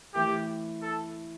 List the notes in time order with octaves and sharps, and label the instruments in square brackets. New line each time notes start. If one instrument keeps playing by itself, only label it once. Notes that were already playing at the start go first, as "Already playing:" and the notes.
[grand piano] E3 A3 E4 [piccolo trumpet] G4
[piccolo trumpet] A4